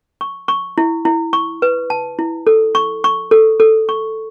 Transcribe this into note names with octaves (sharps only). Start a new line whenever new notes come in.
C#6
C#6
E4
E4
C#6
B4
A5
E4
A4
C#6
C#6
A4
A4
C#6